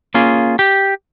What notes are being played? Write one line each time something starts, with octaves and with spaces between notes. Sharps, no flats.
A#3 C#4 F4 G#4
G4